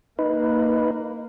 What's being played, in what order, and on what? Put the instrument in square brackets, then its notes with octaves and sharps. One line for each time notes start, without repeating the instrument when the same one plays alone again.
[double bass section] A#3 [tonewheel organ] D#4 B4